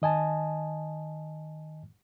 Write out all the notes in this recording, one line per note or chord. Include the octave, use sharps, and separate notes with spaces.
D#3 D#5 G#5 A5